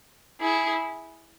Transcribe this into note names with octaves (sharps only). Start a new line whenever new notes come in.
E4 G#4